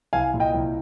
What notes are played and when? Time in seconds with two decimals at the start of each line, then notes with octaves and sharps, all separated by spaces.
0.13 C2 F5 G#5
0.34 A#2
0.40 D#5 G5
0.54 C2